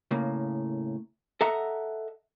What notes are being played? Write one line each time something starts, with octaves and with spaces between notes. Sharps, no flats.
A2 C#3 A#3
A4 D#5 E5 F#5 A#5